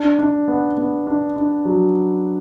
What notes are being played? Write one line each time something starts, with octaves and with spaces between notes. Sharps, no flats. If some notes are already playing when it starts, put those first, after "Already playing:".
Already playing: D4
D4
B3
B3
D4
D4
F#3